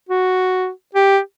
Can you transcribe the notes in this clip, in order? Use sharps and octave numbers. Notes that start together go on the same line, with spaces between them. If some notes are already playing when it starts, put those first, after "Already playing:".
F#4
G4